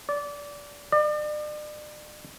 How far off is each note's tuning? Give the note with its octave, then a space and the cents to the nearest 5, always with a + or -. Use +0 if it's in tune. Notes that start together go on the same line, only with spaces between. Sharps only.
D5 -20
D5 +40